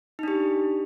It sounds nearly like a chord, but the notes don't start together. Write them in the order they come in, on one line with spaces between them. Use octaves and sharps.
D#4 D4 G4